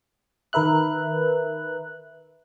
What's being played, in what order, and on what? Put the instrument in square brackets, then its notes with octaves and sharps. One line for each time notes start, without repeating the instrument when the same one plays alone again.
[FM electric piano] D#3 A#4 B4 E5 F#6